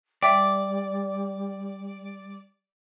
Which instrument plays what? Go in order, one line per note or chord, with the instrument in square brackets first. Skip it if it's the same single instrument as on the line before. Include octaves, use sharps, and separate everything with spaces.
[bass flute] G3 [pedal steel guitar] D5 [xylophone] E5 G5